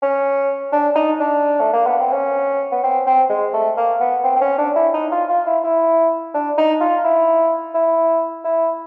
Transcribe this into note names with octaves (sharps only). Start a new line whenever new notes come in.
C#4
D4
D#4
D4
A3
A#3
B3
C4
C#4
B3
C4
C4
G#3
A3
A#3
B3
C4
C4
C#4
D4
E4
D#4
F4
F4
E4
E4
D4
D#4
F4
E4
E4
E4